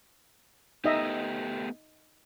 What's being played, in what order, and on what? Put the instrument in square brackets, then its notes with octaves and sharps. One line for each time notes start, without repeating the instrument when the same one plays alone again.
[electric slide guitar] A3 B3 G4 [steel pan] D#4 D#5 E5